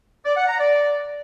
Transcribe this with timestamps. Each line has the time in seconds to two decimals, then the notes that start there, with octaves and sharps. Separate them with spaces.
0.25 D5
0.36 F#5
0.48 A#5
0.59 D5